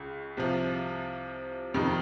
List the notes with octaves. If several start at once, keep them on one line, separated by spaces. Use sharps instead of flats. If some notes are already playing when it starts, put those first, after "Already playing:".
Already playing: C#2 C#3
C2 C3 F3
F2 C3 D#3 G3